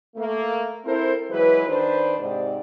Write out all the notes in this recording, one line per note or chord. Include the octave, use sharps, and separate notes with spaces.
A3 A#3
C4 E4 A4 A#4 C5
E3 F#3 G#3 B4
D#3 D4 B4 C5
G#2 C3 D5